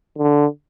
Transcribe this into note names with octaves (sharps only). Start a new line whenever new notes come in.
D3